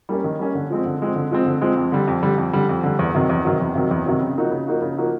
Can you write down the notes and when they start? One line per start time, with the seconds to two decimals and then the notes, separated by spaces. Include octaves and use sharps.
0.09 G3 A#3 C#4
0.24 D#3
0.39 G3 A#3 C#4
0.55 D3
0.70 F3 G#3 C4
0.86 D3
1.00 F3 G#3 C4
1.16 D3
1.31 F3 G#3 C4
1.46 D3
1.61 F3 G#3 C4
1.77 F2
1.92 D3 G3
2.07 F2
2.22 D3 G3
2.38 F2
2.53 D3 G3
2.69 F2
2.83 D3 G3
2.99 E2
3.15 C3 D#3 F#3
3.29 E2
3.45 C3 D#3 F#3
3.61 E2
3.75 C3 D#3 F#3
3.91 E2
4.06 C3 D#3 F#3
4.21 C#3
4.37 F3 A#3 D#4 F#4
4.51 C#3
4.67 F3 A#3 D#4 F#4
4.82 C#3
4.97 F3 A#3 D#4 F#4